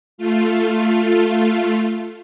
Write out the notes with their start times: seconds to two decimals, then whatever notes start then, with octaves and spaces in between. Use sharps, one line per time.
0.18 A3 F4